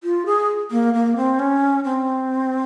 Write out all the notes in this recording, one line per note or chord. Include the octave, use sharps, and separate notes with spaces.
F4
G#4
A#3
A#3
C4
C#4
C4